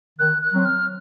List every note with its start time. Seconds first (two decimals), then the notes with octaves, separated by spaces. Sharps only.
0.19 D#3 F#6
0.42 F#6
0.53 F#3 C4
0.65 F6